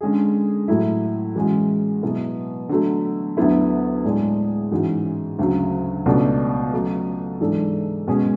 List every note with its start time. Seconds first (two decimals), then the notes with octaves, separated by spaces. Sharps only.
0.01 D3 G#3 C#4 G#4
0.68 A2 F#3 A3 E4
1.36 E3 G#3 C#4 F#4
2.03 B2 F#3 B3 E4
2.69 D3 F#3 A3
3.37 D2 D3 F#3 B3 E4
4.04 A2 G#3 D4 G#4
4.71 G#2 E3 G#3 C#4 F#4
5.39 D2 C#3 F#3
6.06 C#2 B2 A3 D4
6.73 C#3 F#3 A3
7.40 G#2 E3 G#3 D4 A4
8.07 B2 G#3 C#4 G#4